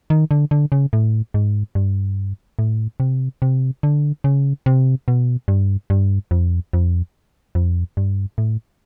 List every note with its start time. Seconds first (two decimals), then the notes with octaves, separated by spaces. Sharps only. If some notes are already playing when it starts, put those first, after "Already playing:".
0.10 D#3
0.31 D3
0.51 D3
0.72 C#3
0.93 A2
1.34 G#2
1.75 G2
2.59 A2
3.00 C3
3.42 C3
3.83 D3
4.24 C#3
4.66 C3
5.08 B2
5.48 G2
5.90 G2
6.31 F2
6.73 F2
7.55 F2
7.97 G2
8.38 A2